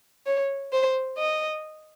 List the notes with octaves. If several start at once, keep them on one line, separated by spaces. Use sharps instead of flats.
C#5
C5
D#5